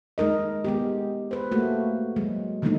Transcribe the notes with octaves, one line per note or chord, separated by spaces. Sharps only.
G#3 D#4 A#4 D#5
G#3 B3 G4
B4 C5
A3 A#3 F#4
F#3 G#3
D3 E3 F#3 A3 A#3 D#4